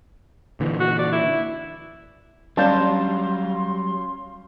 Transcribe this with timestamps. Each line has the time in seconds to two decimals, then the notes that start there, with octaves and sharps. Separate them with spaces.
0.60 A#2 D3 E3
0.80 F#4
0.99 D5
1.12 E4
2.57 F#3 G3 C#4 D4 F5 A5 C6 G6